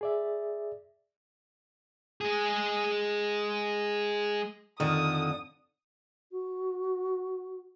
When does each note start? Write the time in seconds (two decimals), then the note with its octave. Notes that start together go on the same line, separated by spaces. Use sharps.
0.01 G#4 D5 E5
2.21 G#3 G#4
4.80 F2 D3 D#3 D#6
6.31 F#4